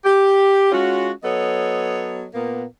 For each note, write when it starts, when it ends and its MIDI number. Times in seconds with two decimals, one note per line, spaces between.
0.05 0.71 67
0.72 1.11 56
0.72 1.11 61
0.72 1.11 65
0.72 1.11 66
1.23 2.25 54
1.23 2.25 59
1.23 2.25 69
1.23 2.25 73
1.23 2.25 75
2.34 2.64 46
2.34 2.64 58
2.34 2.64 59